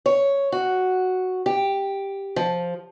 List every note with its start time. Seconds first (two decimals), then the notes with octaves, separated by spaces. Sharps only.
0.06 C#5
0.52 F#4
1.46 G4
2.36 F3